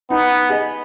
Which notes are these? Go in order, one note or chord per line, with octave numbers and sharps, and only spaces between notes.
B3 D#4
G#4 D#5